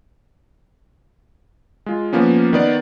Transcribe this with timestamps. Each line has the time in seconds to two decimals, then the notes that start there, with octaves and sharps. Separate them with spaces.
1.86 G#3 F4
2.13 F3 A#3 B3 C#4
2.53 D#3 B3 D5